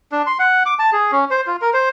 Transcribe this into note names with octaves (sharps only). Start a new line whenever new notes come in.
D4
C6
F#5
D6
A5
G#4
C#4
C5
F4
A#4
C5